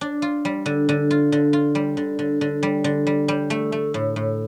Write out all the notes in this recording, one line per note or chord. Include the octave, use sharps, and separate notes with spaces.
D4
F4
G3
D3
D3
F4
D3
F4
G3
D3
D3
D3
G3
D3
G3
G3
A3
A3
A2
A2